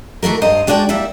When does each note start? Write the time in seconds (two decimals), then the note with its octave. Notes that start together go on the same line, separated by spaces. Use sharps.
0.23 D#3 E3 A3 F#4 A#4
0.42 G2 C5 D#5 A#5
0.67 G#3 D4 F#4 D5 G5
0.89 G3 A#3 E4 D5 E5